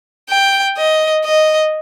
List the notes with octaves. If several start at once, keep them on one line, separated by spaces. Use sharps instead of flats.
G5
D#5
D#5